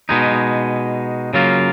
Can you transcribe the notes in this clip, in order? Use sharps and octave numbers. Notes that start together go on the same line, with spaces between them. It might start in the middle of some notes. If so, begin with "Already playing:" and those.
B2 G#3 D#4
C#3 F#3 A#3 F4